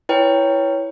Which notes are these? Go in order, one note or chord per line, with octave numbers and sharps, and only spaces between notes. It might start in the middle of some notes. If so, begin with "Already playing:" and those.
E4 B4 C#5 G5